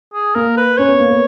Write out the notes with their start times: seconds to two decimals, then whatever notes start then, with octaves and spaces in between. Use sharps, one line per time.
0.14 G#4
0.35 A#3 A#4
0.57 B4
0.78 C#4 C#5
0.89 B3
1.00 A#3
1.10 B3